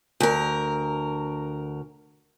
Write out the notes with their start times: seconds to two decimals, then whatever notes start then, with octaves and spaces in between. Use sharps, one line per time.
0.20 D2 A#4